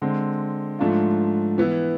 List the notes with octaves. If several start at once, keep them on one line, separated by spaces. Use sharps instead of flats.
D3 G#3 C4
G#2 F3 A3 D4 F4
E3 B3 E4